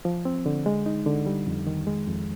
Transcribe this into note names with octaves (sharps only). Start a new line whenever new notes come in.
F3
C4
D3
G#3
D#4
D3
G3
F2
D#3
G#3
F2